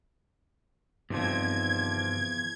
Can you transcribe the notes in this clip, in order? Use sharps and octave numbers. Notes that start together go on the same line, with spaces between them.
E2 G2 C3 D#3 F3 C4 G#6